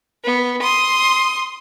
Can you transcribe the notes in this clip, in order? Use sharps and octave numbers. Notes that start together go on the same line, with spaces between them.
B3
C6 D#6